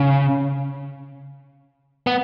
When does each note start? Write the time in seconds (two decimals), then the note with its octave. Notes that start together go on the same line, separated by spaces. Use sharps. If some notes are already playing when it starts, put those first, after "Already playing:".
Already playing: C#3
2.07 B3